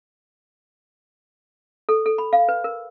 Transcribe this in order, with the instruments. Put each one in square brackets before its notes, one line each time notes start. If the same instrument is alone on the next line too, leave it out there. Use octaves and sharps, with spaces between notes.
[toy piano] A4
A4
B5
F5
B4
A#4